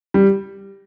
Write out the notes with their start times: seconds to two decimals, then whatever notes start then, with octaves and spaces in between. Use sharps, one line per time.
0.14 G3